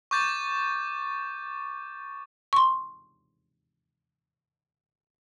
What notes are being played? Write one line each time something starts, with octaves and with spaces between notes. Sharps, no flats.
C#6 D6 G6 A6
C6 C#6